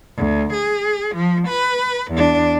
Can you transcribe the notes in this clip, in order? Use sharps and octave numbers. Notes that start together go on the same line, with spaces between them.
D2
G#4
F3
B4
E2 D4